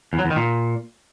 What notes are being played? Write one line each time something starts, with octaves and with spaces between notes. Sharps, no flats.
E2
F#3
E2
D#3
A#2